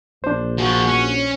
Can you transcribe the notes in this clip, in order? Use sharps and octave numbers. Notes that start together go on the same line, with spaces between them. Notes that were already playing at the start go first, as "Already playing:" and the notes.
A#1 D4 C5
F3 F#4 G#4
C#4